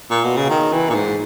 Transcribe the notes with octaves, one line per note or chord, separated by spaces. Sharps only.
A#2
B2
C#3
D#3
E3
A#2
G#2